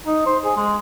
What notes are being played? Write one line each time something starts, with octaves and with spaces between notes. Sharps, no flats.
D#4
C5
G#4
G#3